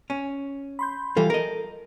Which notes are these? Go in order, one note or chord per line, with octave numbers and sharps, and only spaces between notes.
C#4
B5 C6 G6
E3 G3 F4 A4
A#4 D#5